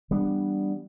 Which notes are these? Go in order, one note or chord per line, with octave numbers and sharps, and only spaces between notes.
E3 G3 B3 D4